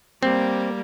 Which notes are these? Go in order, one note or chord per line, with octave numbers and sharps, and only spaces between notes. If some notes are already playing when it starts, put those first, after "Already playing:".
G3 A#3 C4